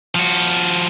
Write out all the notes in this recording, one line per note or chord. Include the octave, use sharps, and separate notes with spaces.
F3 F#4